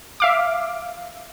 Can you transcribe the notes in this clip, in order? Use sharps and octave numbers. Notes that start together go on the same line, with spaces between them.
E5 F5 D6